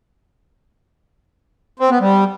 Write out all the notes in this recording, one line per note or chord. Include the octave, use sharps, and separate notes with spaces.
C4
B3
G3